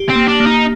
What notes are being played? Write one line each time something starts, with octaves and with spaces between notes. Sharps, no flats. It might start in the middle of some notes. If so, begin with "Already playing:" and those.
Already playing: G4
C4
A#3
D4
A#3
D#4